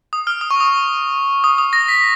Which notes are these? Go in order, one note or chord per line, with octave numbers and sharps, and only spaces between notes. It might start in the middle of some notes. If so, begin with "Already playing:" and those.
D#6
F6
D#6
C#6
D#6
D#6
D#6
A#6
B6